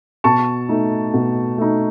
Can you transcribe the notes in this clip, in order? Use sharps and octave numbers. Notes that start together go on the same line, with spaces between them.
B2 A5 C#6
A3 D#4
B2
A3 D#4